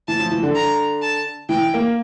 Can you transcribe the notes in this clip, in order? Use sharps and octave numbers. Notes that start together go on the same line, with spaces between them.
E3 A5
F3
E3
D3
A#5
A5
E3 G5
A#3